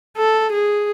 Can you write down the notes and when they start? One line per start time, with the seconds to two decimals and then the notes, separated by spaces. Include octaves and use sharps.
0.17 A4
0.52 G#4